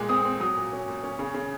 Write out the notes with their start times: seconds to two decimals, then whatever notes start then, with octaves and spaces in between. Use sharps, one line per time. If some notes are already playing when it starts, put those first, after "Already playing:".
Already playing: A#2 G#3
0.09 C4 D#6
0.25 C4
0.40 F#3 D#6
0.56 A#2
0.73 C#4
0.88 A#2
1.04 C#4
1.19 C#3
1.34 C#3